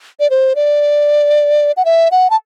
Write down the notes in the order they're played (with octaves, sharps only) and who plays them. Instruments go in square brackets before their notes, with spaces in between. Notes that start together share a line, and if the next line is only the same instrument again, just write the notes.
[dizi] D5
C5
D5
F#5
E5
F#5
A5